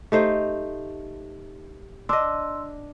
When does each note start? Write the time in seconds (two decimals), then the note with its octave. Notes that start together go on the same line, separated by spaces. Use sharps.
0.12 A3 D#4 G4 C5
2.09 D4 D#5 C6 E6